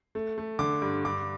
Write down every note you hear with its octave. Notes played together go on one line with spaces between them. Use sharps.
A3
A3
D3 D6
G2
G2 D6